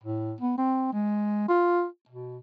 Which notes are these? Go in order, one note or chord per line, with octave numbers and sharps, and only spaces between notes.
A2
B3
C4
G#3
F4
B2